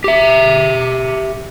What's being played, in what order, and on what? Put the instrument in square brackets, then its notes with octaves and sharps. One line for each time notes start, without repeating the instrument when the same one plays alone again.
[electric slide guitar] G4 E5